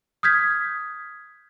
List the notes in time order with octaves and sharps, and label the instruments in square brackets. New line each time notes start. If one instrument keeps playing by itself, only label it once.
[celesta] D#6 F6 G6 G#6 B6